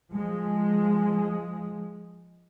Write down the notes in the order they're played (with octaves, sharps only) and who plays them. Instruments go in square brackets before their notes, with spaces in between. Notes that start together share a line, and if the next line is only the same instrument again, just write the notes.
[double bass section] F3 G#3